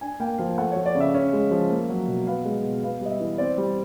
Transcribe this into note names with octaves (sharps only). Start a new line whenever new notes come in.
D4 G#5
A#3 G5
F3 F5
A3 F#5
F3 C#5
D5
C#3
E5
C#4
G#3
F3
A#3
F#3
B2
B3 F5
G#3
B2
B3 F5
G3 D#5
E5
E3
C4 D5
G3